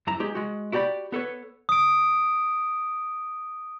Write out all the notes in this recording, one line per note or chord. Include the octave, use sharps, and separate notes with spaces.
F#2 E4 A#5
G#3 G4 G#4
G#3 F#4
E4 F#4 G4 D5 B5
B3 A4 B4 C#5
D#6 D7